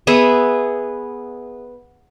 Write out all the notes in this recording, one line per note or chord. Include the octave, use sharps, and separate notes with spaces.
B3 G#4 E5